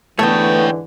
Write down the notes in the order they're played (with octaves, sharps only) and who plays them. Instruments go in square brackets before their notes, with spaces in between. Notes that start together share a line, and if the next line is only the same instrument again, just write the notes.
[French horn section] G#2 D3 E3 [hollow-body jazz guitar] A3 B3 [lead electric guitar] C#5 G5